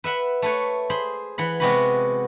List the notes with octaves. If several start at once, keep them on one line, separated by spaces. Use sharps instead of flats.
B4 E5 F#5 B5
A3 B4 C#5
G#4 C5 B5 C6
E3 F#5 B5
C3 G#3 B3 F#4 B4 B5